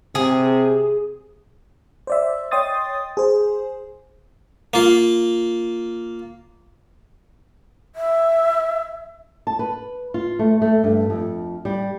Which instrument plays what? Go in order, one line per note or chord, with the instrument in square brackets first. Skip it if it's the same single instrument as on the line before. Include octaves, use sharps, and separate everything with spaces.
[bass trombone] C3 [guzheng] G#4
[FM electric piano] C5 D5 E5
C#5 D#5 G5 C6 D#6 A6
G#4 C5
[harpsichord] A#3 F4
[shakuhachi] E5
[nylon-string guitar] A5
B4
F4
A3
A3
G2
F2
G3